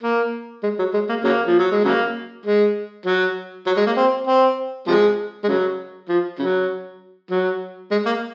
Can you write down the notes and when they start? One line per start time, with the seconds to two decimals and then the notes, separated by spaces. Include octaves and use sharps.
0.03 A#3
0.63 G#3
0.79 F#3
0.94 G#3
1.09 A#3
1.24 C#3 F#3 A#3
1.47 F3
1.59 F#3
1.72 G#3
1.85 C#3 F#3 A#3
2.45 G#3
3.06 F#3
3.66 F#3
3.77 G#3
3.86 A#3
3.97 C4
4.27 C4
4.88 C3 F3 G#3
5.44 G#3
5.48 C#3 F#3
6.09 F3
6.39 C#3 F#3
7.31 F#3
7.91 G#3
8.06 A#3